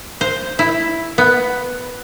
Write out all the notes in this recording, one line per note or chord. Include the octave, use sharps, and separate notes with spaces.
C5
E4
B3